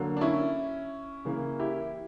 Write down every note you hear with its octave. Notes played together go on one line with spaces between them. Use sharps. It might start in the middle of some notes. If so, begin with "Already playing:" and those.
Already playing: D3 F#3 A#3
D4
C#4 E4
C#3 E3 A#3
E4 G4